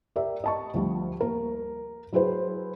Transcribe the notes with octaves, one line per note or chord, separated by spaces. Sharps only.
G4 A#4 D5 E5
D#5 A5 C#6
D2 F3 G3
A#3 A#4
F#3 E4 G#4 B4 C5